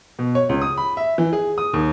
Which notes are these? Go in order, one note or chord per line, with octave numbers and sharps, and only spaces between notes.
B2
C#5
C#2
D#6
B5
E5
E3
G#4
D#6
D#2